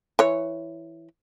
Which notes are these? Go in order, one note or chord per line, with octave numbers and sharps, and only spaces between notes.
E3 C#5